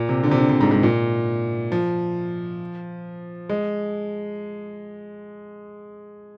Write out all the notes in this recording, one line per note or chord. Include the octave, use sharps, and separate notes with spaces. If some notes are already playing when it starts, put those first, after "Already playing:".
Already playing: A#2
C3
D3
C3
D3
C3
G#2
G#2
A#2
F3
G#3